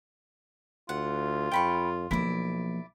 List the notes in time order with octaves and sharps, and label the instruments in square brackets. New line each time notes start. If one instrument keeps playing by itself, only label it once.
[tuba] D2 [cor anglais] F4 [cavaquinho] F#5
[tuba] F2 [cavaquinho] G5 B5 C#6
[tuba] B1 [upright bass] F3 A#3 [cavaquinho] E4 D5